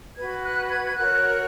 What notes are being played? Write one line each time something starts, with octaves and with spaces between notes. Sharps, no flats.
F#4 B4 G#6
F#6
G#6
G#6
F#4 A#4 C#5 F#6